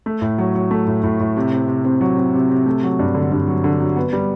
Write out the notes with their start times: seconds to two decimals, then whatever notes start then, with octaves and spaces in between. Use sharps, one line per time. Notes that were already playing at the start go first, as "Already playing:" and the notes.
0.06 A3
0.22 A2
0.38 F#3
0.55 F#3
0.71 A3
0.87 A2
1.03 A2
1.20 A2
1.37 C3
1.52 C4
1.68 C3
1.85 C4
2.01 F#3
2.17 C4
2.34 C3
2.51 C3
2.66 A3
2.83 F#3
2.99 G2
3.15 D3
3.32 G2
3.48 F#3
3.64 D3
3.80 F#3
3.96 B3
4.13 G3